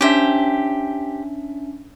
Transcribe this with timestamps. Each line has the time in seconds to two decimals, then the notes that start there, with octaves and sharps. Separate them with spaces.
0.01 C#4 D4 G4 C5 E5